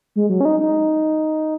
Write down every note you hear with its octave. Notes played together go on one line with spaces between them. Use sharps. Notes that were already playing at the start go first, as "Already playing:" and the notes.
G#3
F#3
C#4
D#4
D#4